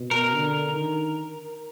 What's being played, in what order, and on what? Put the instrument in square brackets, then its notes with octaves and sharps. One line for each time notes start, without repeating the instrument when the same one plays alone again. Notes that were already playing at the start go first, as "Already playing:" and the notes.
Already playing: [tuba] B2
[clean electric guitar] A#4
[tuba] D3
D#3